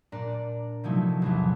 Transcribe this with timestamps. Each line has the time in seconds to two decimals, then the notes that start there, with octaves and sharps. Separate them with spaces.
0.12 A#2 D4 D5 A#5
0.84 C3 F3 F#3 A3 D#4 E4
1.22 A1 E2 A3